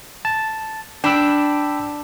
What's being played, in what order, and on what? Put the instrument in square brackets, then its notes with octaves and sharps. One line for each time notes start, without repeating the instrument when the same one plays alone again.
[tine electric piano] A5
[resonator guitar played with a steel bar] D4 [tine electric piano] G5 B5 E6